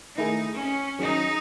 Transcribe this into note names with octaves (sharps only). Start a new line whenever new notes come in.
D#3 A3 D#4 E4 G#4
C#4
D#3 F#3 C#4 D#4 G#4